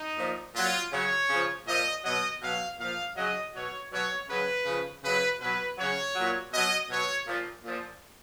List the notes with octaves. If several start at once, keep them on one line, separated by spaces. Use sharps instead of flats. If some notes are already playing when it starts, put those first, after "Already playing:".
Already playing: D#4
A#2 F3
A#2 F#3 F4
C#3 F#3 C#5
C#3 F3
A#2 F3 D#5
B2 F#3 D#5
B2 F#3 F5
A#2 F3 F5
C#3 F#3 D#5
B2 F#3 C#5
B2 F#3 C#5
C#3 F#3 B4
C#3 F3
C#3 F#3 B4
B2 F#3 B4
C#3 F#3 C#5
A#2 F#3
B2 F#3 D#5
B2 F#3 C#5
A#2 F3
A#2 F3